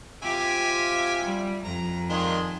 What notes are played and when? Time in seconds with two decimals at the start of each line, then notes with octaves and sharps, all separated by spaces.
0.23 C3 F4 G4 E5 G#5
1.24 G3
1.64 F2 A#5
2.10 D#3 G#3 D4 F4 C6